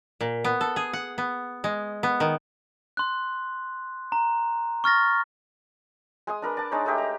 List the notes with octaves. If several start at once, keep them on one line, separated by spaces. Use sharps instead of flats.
A#2
B3
A4
G#4
F#5
B3
G#3
B3
D#3
C6 F#6
A#5
C#6 F6 A6 A#6
G#3 G#5 D#6
D4 A#4 B4
D5 A5
G#3 D4 D#4 C#5
G#3 A3 D#4 G4
A#5